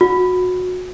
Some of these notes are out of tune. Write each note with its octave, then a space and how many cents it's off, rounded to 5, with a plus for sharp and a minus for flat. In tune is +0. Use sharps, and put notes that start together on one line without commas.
F#4 -25